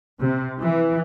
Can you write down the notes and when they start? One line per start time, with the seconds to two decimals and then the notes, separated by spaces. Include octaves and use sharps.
0.21 C3
0.59 E3